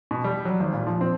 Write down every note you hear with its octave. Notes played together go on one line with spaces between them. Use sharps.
B2
G3
F#3
G#1
A#2
F3
C4